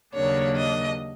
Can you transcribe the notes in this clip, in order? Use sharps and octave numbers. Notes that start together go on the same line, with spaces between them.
D#2 C#3 F#3 A#3 D4 C#5
D#5